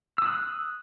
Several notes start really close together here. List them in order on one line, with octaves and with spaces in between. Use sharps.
E6 D#6 F#6